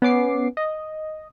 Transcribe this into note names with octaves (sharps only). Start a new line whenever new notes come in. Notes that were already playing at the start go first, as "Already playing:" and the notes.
B3 C#4 D6 C7
D#5